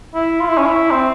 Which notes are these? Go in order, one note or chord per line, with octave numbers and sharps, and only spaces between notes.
E4
F4
E4
C#4
E4
C4